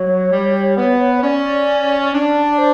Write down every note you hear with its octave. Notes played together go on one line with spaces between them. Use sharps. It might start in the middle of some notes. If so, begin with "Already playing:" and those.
Already playing: F#3 C#5
G3
B3
C#5
C#4 D5
D4 D5
C5